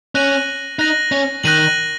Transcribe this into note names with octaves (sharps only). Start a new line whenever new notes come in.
C#4 F#6 A#6 D#7 F#7
D#4 F#6 A#6 D#7 F#7
C#4
D#3 F#6 A#6 D#7 F#7